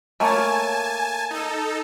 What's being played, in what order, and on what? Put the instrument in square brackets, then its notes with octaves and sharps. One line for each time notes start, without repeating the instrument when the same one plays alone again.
[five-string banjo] A3 A#3 C#5 [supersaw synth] G#5 A5
[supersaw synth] D#4 A4